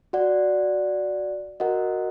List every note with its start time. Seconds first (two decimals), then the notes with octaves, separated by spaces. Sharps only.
0.13 F#4 D5 F#5
1.60 F#4 A#4 D#5 F#5